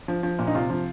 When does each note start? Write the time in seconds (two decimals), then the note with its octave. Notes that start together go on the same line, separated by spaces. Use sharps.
0.08 F3
0.23 F3
0.39 A#2
0.47 D#4
0.54 C3 F4
0.70 F3